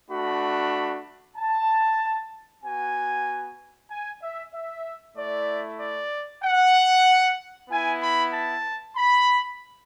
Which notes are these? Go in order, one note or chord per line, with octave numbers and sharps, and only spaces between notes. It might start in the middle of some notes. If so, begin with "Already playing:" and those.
A3 D4 F#4 B5
A5
B3 F#4 G#5
G#5
E5
E5
A3 E4 D5
D5
F#5
B3 E4 G#5
B5
A5
B5